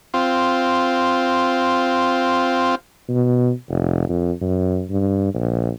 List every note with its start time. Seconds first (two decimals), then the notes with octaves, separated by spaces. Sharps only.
0.14 C4 F4
3.09 B2
3.70 F1
4.09 F2
4.41 F#2
4.90 G2
5.34 A#1